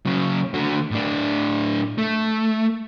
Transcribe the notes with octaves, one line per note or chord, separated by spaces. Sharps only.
C#3 F#3
D3 F#4
A2 D4
A3